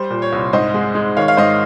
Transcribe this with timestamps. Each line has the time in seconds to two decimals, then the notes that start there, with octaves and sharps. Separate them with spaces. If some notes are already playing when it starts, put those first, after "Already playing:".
Already playing: G3 C5
0.10 A#2
0.22 C#5
0.32 C2
0.53 G#2 C5 D#5
0.74 G#3
0.95 G#3
1.17 D#3 C#5 F5
1.28 F5
1.37 G#2 C5 D#5